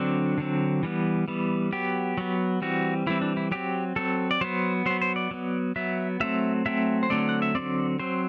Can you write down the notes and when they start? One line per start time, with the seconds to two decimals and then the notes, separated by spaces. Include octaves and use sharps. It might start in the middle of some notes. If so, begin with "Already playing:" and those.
Already playing: D3 F#3 C4 D4
0.38 D3 F#3 C4
0.83 E3 G3 B3
1.28 E3 G3 B3
1.73 F#3 B3 G4
2.18 F#3 B3
2.62 E3 G3 C4 F#4
3.07 E3 G3 C4 E4
3.22 D4
3.37 E4
3.52 F#3 C4 G4
3.96 F#3 C4 A4
4.31 D5
4.41 F#3 B3 C5
4.86 F#3 B3 C5
5.01 C5
5.16 D5
5.31 F#3 B3
5.76 F#3 B3 E5
6.20 F#3 A3 C4 E5
6.66 F#3 A3 C4 E5
7.03 C5
7.10 D3 F#3 A3 C4 D5
7.29 F#5
7.42 E5
7.55 D3 F#3 A3 C4 D5
7.99 F#3 C4 C5